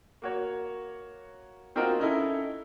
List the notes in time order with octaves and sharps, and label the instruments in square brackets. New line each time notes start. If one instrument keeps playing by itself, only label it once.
[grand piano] A#3 F#4 C#5
A#3 C4 D#4 F4 F#4 A#4
C#4 D#4 E4 A4